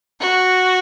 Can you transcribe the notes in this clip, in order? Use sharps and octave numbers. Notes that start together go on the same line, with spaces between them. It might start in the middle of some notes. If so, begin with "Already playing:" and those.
F#4